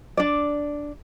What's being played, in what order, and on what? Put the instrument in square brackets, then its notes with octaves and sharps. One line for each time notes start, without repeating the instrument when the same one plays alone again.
[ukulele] D4 D5